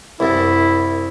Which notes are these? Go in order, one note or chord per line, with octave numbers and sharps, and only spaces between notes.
C2 F#2 E4